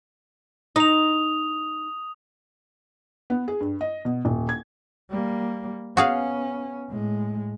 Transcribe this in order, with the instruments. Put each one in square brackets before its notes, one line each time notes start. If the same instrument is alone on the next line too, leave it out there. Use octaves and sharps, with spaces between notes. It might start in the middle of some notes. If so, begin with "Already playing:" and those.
[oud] D#4 [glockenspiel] D#6 F7
[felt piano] B3
G#4
G2
D#5
B2
D#1
G#6
[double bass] G3 A#3
[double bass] B3 C#4 [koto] F#4 G#4 F5
[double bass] A2 G#3